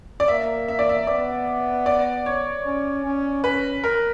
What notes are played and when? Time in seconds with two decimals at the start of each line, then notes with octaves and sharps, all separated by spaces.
0.20 D5
0.28 A#3 E5
0.68 E5
0.79 D5
0.89 E5
1.07 B3 D5
1.86 D5
2.26 C#5
2.65 C#4
3.05 C#4
3.44 C#4 B4
3.84 A#4